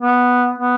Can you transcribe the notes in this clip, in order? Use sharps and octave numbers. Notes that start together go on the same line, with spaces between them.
B3
B3